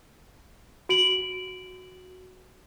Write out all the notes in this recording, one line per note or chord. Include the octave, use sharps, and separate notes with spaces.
F#4 D7 F#7